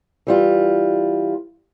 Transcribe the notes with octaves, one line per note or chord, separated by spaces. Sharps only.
E3 G3 F4